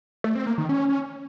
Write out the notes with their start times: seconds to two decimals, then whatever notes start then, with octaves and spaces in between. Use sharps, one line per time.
0.24 A3
0.35 C4
0.47 A#3
0.58 D#3
0.69 C#4